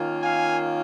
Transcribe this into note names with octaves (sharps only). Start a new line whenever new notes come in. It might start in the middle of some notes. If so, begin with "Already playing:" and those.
Already playing: D#3 A#3 C#4 F4
F5 G#5